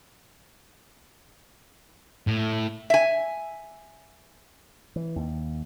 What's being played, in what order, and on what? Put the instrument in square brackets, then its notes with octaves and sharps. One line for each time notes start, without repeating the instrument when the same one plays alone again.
[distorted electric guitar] A2
[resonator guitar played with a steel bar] E5 G#5
[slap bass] E3
D#2